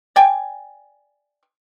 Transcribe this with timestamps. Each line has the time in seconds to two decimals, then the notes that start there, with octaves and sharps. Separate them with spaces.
0.16 D5 G5 G#5